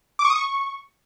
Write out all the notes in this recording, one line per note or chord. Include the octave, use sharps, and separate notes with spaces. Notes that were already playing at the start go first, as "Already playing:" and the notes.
D6
C#6
D#6
C#6